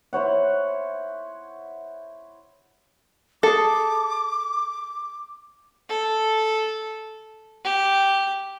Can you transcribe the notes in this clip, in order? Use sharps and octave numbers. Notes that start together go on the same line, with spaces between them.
E4 C5 C#5 F#5
G#4 A4 A5 D6
A4
G4